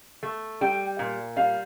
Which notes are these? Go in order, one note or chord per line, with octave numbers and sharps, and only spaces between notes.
A3
G3 G5
A#2
G3 F5